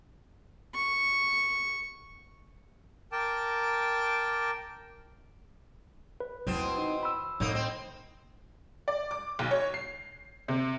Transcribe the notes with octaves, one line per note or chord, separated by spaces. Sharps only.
C#6
A#4 G5 A5 D6
B4
E2 B2 D#3 C4
D#4
B5 E6
F2 A2 A#3 D#4
C4
D5
D6
B1
C#5
C7
C3